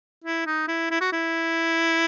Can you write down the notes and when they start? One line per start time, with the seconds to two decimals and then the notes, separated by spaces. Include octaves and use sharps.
0.24 E4
0.47 D#4
0.68 E4
0.91 E4
1.01 F#4
1.13 E4